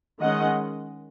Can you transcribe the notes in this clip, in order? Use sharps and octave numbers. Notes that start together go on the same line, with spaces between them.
D#3 G#3 C#4 D#5 F#5